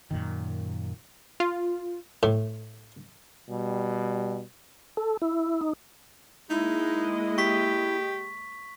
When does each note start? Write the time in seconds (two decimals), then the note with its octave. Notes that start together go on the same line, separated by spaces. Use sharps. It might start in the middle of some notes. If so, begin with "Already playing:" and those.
0.11 F#2 A#2 D#3
1.40 F4
2.23 A2
3.50 B2 G3
4.97 A4
5.22 E4
5.61 D#4
6.50 G#3 A#3 D#4 E4 D#5
7.38 G4 C#6 B6